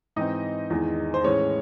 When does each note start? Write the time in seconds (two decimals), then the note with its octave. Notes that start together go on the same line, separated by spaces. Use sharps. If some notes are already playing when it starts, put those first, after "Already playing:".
0.16 G#2 E3 C4 D#4 D#5
0.70 E2 D#3 G#3
1.14 C5
1.24 A2 E3 G#3 C#4 C#5